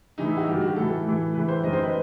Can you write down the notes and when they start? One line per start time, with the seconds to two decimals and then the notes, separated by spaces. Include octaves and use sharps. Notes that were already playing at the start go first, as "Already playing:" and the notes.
0.18 A2 E3 D#4
0.28 E4
0.37 F#4
0.47 G2 D#3 G4
0.61 F#4
0.75 A2 E3 A4
1.05 A2 E3
1.34 A2 E3 B4
1.48 C5
1.63 F#2 D#3 D#5
1.73 C5
1.83 B4